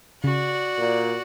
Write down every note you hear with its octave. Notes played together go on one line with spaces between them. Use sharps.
C#3 F#4 D5
A#2